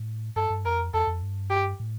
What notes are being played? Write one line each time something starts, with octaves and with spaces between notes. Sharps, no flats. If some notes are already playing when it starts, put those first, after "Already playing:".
Already playing: A2
G2 A4
G2
F2 A#4
F2 A4
F2
G2
G4
A2